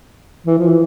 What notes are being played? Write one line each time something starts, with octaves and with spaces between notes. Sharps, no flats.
E3
F3
E3